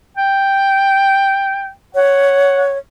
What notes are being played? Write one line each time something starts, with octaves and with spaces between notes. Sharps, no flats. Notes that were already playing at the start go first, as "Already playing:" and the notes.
G5
C#5 F#5